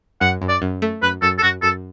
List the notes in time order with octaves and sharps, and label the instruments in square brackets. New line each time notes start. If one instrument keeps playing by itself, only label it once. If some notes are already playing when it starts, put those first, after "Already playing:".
[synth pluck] F#2 [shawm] F#5
[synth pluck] F#2
[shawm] D5
[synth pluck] F#2
A3
[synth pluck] F#2 [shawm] B4
[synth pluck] F#2 [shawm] A4
[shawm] A4
[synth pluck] F#2 [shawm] F#4
[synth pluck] F#2 [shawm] A4